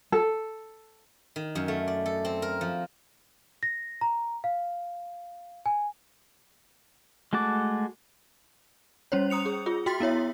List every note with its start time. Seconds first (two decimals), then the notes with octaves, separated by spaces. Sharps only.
0.12 A4
1.36 D#3
1.55 F#2
1.68 A3
1.88 D5
2.06 A4
2.25 C4
2.42 A#4
2.61 F3
3.63 A#6
4.01 A#5
4.44 F5
5.66 G#5
7.33 G#3 A3 F#4 A5 D6
9.12 G3 C#4 C5 C#5
9.30 A#5 D#6 C#7 F7
9.46 G#4
9.66 F4 G#4
9.86 F#4 G5 C6 A6 B6
10.00 B3 E4 C#5 E5